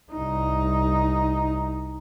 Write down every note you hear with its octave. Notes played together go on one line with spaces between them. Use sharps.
C2 D#4